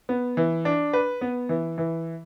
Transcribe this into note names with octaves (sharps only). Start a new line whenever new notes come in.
B3
E3
D4
B4
B3
E3
E3